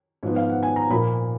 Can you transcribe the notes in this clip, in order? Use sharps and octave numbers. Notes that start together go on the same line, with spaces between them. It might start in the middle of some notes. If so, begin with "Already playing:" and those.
G#2 F3 B3
F5
F#5
G#5
A#5
A#2 F3 A#3 B5